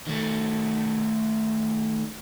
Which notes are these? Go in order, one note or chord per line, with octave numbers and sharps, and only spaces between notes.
D#3 A3